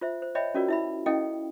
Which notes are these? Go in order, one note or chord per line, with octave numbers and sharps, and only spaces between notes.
F4 C5 E5
C5
C#5 D#5 E5 G5 B5
C#4 F4 F#4 A#4 D5
E4 E5 B5
C#4 E4 A4 D#5 F5 G5